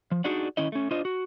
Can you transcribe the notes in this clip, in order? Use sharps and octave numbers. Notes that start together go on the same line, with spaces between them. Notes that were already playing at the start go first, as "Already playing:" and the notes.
F3
D4 D#4 F#4 G#4 D5 F#5
D#3 C#4 E4 D#5
A3 C#4
D4 F4 C5 D#5
F#4